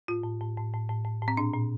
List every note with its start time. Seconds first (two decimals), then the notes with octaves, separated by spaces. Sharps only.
0.08 A2 F4
0.24 A2
0.41 A2
0.57 A2
0.73 A2
0.89 A2
1.05 A2
1.22 A2
1.28 C4
1.37 A#2 D4
1.54 A#2